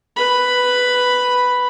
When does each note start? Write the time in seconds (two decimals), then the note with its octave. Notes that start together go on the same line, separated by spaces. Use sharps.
0.16 B4 B5